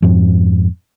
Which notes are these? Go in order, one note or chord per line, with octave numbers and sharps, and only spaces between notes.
F2 G#2 F3